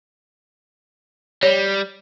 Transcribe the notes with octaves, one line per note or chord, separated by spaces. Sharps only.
G3 C#5